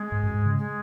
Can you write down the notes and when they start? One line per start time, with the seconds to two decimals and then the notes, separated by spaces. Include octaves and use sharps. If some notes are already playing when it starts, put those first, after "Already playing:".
Already playing: G#3
0.12 G#2
0.23 F#2
0.34 G#2
0.45 C#3
0.57 G#3